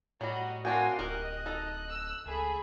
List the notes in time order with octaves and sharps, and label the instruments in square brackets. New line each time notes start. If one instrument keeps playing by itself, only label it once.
[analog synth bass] A2 [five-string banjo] F#3 G3 [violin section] F#4 D#5
[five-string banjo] C4 D4 G5 [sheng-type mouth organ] F#4 G#5 [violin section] A#4 F5 C6
[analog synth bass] D1 [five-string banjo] G4 A#4 [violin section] D#5 [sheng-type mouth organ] F#6
[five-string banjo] D#4 A4
[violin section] E6
[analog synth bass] C#2 [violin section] A3 G#4 B5